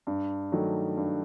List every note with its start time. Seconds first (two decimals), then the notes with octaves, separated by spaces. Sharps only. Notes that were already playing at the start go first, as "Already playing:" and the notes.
0.07 G2
0.52 D#3 F#3 A3 D#4
0.97 G2